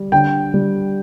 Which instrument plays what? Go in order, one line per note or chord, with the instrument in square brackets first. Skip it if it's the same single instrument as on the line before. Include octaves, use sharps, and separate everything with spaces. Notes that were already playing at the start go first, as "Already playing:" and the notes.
Already playing: [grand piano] G3
D3 G5
G3